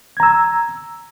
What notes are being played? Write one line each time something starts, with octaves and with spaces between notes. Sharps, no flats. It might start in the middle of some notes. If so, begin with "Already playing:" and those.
A#5 E6 G#6